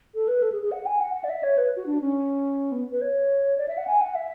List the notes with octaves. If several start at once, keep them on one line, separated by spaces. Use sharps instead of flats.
A4
B4
A4
G#4
G#4
F#5
G#5
F#5
F#5
D5
E5
C#5
B4
F#4
D4
C#4
B3
B4
C#5
D5
E5
F#5
G#5
F#5
E5